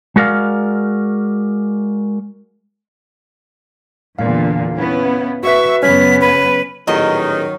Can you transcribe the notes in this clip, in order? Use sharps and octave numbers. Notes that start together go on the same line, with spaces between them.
G#3 F#4 A#4 D5 F5
E2 A#2 D3 F5
B3 C#4 E4
F#4 B4 E5 C#6
F#2 C#3 B3 C#4 C#5 F6 B6
B4
A1 E2 A#2 D#3 F#3 D#5